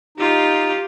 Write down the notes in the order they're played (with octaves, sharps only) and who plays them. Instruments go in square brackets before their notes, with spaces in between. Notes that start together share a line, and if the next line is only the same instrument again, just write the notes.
[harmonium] D#4 [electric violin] F4 G4